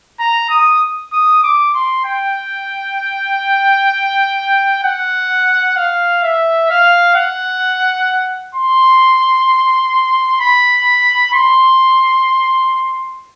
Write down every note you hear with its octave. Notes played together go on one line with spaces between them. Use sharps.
A#5
D#6
D#6
D6
C6
G5
F#5
F5
E5
F5
F#5
C6
B5
C6